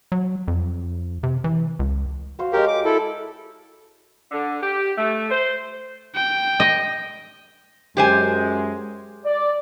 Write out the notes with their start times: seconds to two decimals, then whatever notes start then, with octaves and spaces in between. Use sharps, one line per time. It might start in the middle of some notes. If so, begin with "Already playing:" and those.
0.12 F#3
0.48 F2
1.23 C3
1.44 E3
1.79 C#2
2.39 F#4 C5 F5
2.53 G#3 G4 A#4 C#5 A#5
2.68 D6
2.85 E4 A4
4.31 D3
4.62 G4
4.97 A3
5.30 C5
6.15 G5
6.60 D#5
7.97 F#2 G#3 G4 C5 G#5
9.25 D5